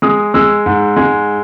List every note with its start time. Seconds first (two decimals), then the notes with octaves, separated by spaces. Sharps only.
0.02 G#3 D#6
0.34 G#3 E6
0.66 G#2
0.96 G#3